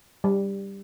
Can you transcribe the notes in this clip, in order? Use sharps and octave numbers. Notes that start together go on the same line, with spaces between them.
G3